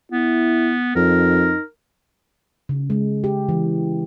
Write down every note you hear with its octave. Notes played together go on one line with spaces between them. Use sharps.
B3 E4
F2 D#4 A#4
C#3
G#3
G4
E3